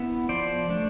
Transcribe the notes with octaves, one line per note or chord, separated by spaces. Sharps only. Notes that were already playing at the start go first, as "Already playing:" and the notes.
Already playing: B3 E4
F3 C5 D5
A3 D4